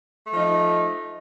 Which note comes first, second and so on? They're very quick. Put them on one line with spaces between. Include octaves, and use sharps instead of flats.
A3 F3 D#4